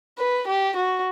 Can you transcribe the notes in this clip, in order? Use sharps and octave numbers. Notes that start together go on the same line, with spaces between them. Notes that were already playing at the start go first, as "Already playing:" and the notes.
B4
G4
F#4